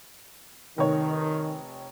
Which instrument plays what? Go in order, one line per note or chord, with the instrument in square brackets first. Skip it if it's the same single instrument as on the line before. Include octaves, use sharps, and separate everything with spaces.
[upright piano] F1 C#5 [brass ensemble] D#3